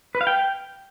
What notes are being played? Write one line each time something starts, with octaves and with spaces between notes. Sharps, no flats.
B4
F5
G5